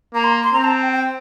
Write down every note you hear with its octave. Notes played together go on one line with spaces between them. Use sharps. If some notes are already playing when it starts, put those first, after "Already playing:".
A#3 A#5
C6
C6
C4 A#5
A5
G5
G5